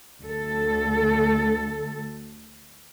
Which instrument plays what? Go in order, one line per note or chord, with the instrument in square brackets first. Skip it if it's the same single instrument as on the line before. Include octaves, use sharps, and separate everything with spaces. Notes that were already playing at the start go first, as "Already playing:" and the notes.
[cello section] D2 A4